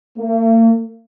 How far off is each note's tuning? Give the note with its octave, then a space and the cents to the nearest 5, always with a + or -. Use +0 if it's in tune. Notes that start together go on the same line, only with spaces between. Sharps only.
A#3 -45